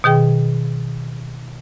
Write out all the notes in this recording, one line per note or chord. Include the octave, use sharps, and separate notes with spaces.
B2 D#3 G#4 G5